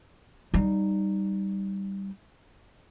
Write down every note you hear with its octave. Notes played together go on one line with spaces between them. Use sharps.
G3 D#4